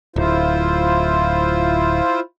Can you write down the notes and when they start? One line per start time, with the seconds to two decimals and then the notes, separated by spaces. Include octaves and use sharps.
0.16 D1 E4 F4 C5